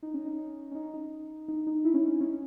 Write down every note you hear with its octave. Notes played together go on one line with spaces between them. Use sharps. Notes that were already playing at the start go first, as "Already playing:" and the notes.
D#4
C#4
D#4
C#4
D#4
D#4
D#4
D#4
E4
C#4
D#4
C#4